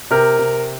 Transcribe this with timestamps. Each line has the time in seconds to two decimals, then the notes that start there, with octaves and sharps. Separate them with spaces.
0.11 C3 A#4
0.38 C3